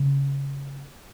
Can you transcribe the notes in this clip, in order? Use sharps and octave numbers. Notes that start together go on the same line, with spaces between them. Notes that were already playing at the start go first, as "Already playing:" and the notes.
Already playing: C#3